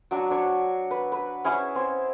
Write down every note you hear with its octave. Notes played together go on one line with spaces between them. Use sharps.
F#3 D4 F#4
D4 C#5
B4
B4
C#4 E4 G#4
C4